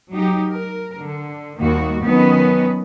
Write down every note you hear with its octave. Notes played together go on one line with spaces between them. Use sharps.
F#3 D#4 G4
A#4
D3
D#2 D#3 G3 A#3 F#4
D#3 F#3 B3 C#4 B4 D#5